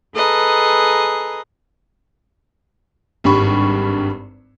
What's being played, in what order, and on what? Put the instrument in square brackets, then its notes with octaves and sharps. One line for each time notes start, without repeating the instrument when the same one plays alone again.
[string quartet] G#4 A4 B4 D#5 A#5
[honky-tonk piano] G#1 G2 G3 B5 C#6